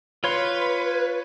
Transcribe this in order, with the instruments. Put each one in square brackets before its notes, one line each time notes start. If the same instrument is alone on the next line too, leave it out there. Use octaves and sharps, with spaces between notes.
[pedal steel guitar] F4 C#5 C6 [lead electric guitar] B4